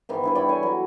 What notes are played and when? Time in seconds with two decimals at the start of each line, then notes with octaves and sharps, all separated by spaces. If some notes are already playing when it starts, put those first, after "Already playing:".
0.09 G#2 D#3 E3
0.23 G2 E4 B4
0.35 E4 C#5 D5 G5
0.48 A4 C#5 G#5
0.63 F#3